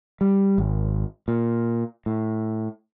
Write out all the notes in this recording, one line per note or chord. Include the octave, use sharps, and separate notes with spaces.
G3
G#1
A#2
A2